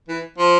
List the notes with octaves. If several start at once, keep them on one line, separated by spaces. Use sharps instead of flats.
E3
F3